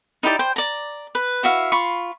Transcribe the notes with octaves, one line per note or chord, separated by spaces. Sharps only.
D#4 E4 G4 D5
C5 G5
D5 A#5
B4
E4 F#4 E5 F5
F4 B5 C#6